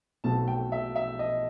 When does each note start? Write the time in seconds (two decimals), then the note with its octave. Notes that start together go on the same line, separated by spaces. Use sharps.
0.24 B1 B2 A3 C4 A5
0.48 G5
0.72 E5
0.96 E5
1.19 D#5